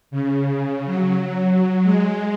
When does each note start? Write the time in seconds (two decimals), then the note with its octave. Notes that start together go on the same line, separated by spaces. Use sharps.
0.11 C#3
0.85 F#3
1.83 G#3